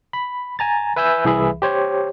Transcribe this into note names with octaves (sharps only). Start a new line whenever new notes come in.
B5
G#5 A#5 A6
B4 E5 G#5 E6 G6
C2 E3 G#4 E5 B5
G4 C5 C#5